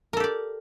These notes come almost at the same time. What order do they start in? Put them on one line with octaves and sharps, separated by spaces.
A#4 A4 G4 D5